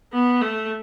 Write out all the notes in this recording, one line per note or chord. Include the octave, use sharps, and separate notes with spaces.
B3
A3